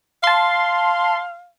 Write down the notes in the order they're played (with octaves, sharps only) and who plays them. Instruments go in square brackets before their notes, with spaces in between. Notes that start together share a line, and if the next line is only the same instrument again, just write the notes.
[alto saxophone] F5 [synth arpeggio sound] A5 C6